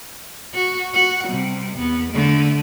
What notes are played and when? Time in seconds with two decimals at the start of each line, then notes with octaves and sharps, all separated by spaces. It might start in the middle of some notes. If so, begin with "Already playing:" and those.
0.55 F#4
0.94 F#4 F#5
1.27 C3 G3
1.76 E2 B3
2.12 D3 A3